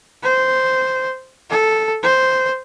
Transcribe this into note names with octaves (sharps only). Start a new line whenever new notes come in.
C5
A4
C5